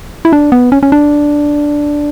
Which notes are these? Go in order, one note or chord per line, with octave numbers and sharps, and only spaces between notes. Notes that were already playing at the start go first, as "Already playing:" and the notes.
E4
D4
B3
C#4
C#4
D4